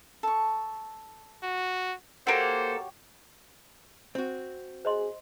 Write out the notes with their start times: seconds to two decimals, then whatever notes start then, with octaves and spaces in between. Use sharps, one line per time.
0.23 A4 C#6
1.43 F#4
2.27 A#3 F#4 G4 A4 C5 C#5
4.15 C4 F#4
4.85 G#4 C5 D#5 C6